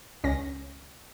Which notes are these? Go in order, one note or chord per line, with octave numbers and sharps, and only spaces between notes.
C#2 C#4 A#6